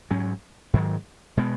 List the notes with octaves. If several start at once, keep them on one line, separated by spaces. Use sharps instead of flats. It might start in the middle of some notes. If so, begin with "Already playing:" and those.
G#2 F#3 C#4
G#2 D#3 F#3
B2 G#3 B3